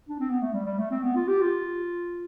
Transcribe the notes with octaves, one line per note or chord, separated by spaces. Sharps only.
D4
C4
B3
A3
G3
G3
A3
C4
B3
F4
G4
F4